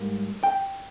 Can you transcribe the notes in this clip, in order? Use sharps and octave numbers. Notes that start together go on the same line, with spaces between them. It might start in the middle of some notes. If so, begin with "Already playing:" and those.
Already playing: G#2 G3 A#3
G5